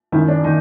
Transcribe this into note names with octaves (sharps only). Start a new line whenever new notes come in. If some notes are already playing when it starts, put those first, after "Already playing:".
F#2 D#3 E4
D4
D#3 D#4